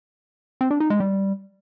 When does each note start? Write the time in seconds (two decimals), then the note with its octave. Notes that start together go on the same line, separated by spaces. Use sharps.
0.61 C4
0.71 D4
0.80 D#4
0.90 G#3
1.00 G3